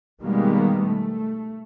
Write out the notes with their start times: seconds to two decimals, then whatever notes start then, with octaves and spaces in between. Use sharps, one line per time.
0.23 B2 D#3 G3 G#3 A#3 B3
0.84 A3